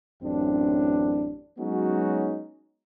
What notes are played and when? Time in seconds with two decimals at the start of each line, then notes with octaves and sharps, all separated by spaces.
0.23 A1 F#2 C4 D4
1.58 F#3 G#3 B3 C#4 D#4 F#4